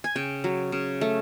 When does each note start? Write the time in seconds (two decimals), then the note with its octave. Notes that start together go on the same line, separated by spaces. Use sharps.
0.04 G#5
0.16 C#3 G5
0.44 F#3
0.72 C#3
1.01 A3